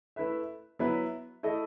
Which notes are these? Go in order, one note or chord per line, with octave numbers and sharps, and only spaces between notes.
A3 E4 B4 E5
F#3 B3 E4 B4
A3 E4 A4 D#5